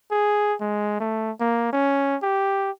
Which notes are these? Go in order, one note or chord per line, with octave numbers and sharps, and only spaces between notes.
G#4
G#3
A3
A#3
C#4
G4